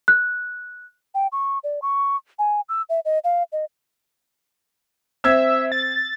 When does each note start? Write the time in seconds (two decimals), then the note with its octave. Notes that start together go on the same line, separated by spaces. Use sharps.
0.08 F#6
1.15 G5
1.32 C#6
1.64 D5
1.82 C#6
2.39 G#5
2.69 E6
2.89 E5
3.05 D#5
3.24 F5
3.52 D#5
5.24 C4 E5 E6 G#6
5.72 A6